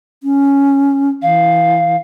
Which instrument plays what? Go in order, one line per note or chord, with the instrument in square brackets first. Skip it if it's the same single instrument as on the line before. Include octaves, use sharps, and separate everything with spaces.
[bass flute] C#4
[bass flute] E3 [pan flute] F5